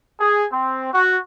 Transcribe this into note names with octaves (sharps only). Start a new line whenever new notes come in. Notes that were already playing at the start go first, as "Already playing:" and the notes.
G#4
C4
F#4